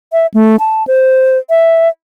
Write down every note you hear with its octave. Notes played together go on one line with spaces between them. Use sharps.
E5
A3
A5
C5
E5